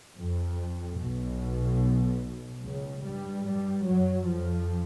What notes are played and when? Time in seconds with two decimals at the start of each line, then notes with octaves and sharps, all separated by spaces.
0.16 F2
0.99 B1 B2
2.64 C#2 C#3
3.05 G2 G3
3.46 G2 G3
3.88 F#2 F#3
4.29 F2 F3